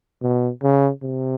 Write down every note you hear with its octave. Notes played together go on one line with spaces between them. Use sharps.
B2
C#3
C3